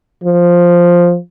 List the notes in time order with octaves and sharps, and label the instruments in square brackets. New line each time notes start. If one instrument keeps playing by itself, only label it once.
[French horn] F3